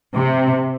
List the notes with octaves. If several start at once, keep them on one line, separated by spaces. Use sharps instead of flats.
C3